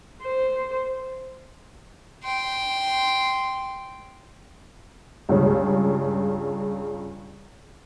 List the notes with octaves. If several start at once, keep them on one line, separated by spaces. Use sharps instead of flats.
C5
G5 C6
C#2 G2 C#3